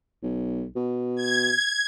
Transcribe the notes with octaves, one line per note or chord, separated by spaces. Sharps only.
B1
B2
G#6